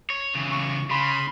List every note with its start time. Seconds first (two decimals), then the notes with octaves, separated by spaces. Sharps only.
0.10 C#5
0.35 C#3 E3
0.51 C#6
0.91 C#3 B5 C6